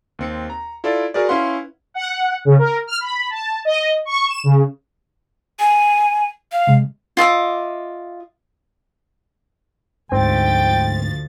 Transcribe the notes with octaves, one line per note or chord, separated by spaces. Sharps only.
D#2 C4 C#7
A#5
E4 F4 A4 D5
F#4 G#4 A#4 B4 D5
C#4 E4 B4 F5 F#5 C6
F#5
C#3
A#4
F6
B5
A5
D#5
C#6
E7
C#3
G#5
F5
C3 G#3
F4 D#5 E5 D6
D2 G#2 F3 C4 G5 A6